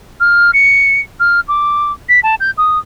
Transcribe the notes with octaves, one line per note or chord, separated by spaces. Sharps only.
F6
C#7
F6
D6
B6
A5
G6
D#6